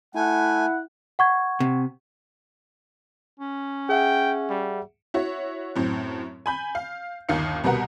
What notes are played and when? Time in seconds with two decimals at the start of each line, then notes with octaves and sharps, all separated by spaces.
0.15 A3 E4 F#5 G#5
1.19 F#5 C#6 G#6
1.60 C3
3.40 C#4
3.89 G#4 E5 F#5 G5
4.50 G3
5.14 E4 F#4 C#5
5.76 F#2 A2 C4
6.46 G#5 B5 G6
6.75 F5
7.29 G1 D#2 D#3 F5 C#7
7.64 C2 B2 G3 A#4 B4 F#5